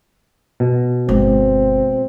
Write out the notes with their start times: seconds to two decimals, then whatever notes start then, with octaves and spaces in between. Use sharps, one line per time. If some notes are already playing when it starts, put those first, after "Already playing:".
0.60 B2
1.09 G1 G#3 C4